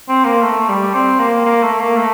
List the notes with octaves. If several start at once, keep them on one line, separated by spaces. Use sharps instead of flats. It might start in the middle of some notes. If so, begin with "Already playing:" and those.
C4
A#3
A3
G3
C4
A#3
A#3
A3
A#3
A3